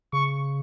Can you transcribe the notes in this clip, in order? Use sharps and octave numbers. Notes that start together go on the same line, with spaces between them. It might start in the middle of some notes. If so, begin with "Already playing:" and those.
C#3 C#6